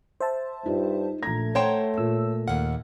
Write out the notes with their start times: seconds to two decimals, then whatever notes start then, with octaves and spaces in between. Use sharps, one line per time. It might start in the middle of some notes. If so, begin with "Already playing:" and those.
0.21 C5 E5 A5
0.66 G2 D#4 F4
1.23 A#1 A3 A#5 G#6 A#6
1.55 C5 C#5 F#5 G5 C6 E7
1.98 A#2 E6
2.48 D#2 F5 F#5